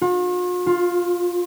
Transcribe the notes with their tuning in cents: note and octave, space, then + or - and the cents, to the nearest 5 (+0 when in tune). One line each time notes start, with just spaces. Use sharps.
F4 +45
F4 +10